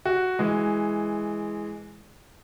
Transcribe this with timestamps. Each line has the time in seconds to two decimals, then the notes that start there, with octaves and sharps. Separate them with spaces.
0.05 F#4
0.39 E3 G#3